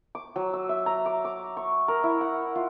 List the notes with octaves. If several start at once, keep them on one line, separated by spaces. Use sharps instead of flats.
D6
F#3
E6
E5
A#5
D6
D6
C#6
A#4
E4
F#5
F4